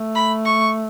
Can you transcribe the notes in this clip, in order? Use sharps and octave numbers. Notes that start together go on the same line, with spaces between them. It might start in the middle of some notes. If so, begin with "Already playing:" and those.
Already playing: A3
B5
C#6